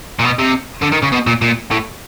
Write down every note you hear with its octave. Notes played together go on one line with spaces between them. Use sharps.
A#2
B2
C3
D3
D#3
C#3
B2
A#2
A#2
A2